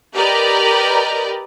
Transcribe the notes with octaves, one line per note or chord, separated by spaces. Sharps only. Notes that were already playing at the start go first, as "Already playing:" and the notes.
G4 A#4 B4 D5 D#5